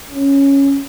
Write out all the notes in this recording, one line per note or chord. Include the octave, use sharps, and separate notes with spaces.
C#4